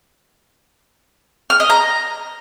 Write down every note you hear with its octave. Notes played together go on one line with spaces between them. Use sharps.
F6
D#5
A#5